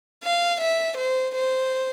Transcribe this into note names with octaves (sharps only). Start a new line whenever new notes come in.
F5
E5
C5
C5